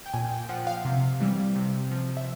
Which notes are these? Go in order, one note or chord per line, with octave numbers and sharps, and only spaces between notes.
G5
A#2 G#5
G5
F3 F#5
F5
C3
E3 G3
C3
F3
E5